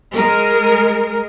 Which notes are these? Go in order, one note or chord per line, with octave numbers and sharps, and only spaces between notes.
G#3 A#4